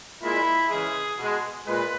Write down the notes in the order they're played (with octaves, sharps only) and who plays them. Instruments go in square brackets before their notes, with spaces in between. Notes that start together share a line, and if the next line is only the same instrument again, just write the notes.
[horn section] A#2 G#3 E4
C#3 E3 G#3 G#4
B2 G#3
A#2 G#3 B4